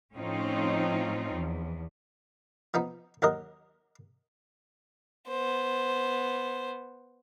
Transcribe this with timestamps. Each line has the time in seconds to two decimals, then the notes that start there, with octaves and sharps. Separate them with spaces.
0.17 A2 F3 C4 C#4 D#4 F4
1.36 E2
2.74 F3 B3 D#4
3.22 D#2 F#3 A#4 D#5
5.28 B3 C5